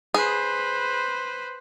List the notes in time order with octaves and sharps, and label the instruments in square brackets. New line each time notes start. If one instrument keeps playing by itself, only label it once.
[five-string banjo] G#4 [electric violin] B4 C5